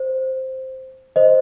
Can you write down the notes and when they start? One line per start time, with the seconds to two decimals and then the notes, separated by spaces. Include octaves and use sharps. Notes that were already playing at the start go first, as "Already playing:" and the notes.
Already playing: C5
1.16 C5 D#5